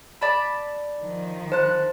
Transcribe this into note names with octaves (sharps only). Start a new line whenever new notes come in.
D5 A5 B5
D#3 F3
C5 A5 F#6